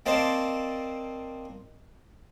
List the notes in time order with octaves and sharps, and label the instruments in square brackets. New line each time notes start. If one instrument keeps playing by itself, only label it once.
[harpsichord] A#3 C4 C5 D5 D#5 A5